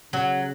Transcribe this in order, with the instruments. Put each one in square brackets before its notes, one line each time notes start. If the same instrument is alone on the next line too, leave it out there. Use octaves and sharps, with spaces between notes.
[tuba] C#3 [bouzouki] F#3